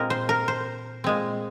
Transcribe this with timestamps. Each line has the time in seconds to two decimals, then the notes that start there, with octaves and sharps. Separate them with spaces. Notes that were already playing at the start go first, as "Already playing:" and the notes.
Already playing: A#2 G#3 C4 A#4
0.10 C5
0.29 A#4
0.48 C5
1.04 A#2 G#3 C4